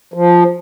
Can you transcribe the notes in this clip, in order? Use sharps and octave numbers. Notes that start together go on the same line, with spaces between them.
F3